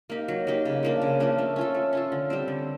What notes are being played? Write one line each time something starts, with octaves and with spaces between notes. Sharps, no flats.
A#3 D#4 G4
F#3
A#3 D#4 G4
C#3
F3 A#3 D4
C#3
F3 A#3 D4
A3
C#4 F4 A4
A3
C#4 F4 A4
D3
G3 C4
D3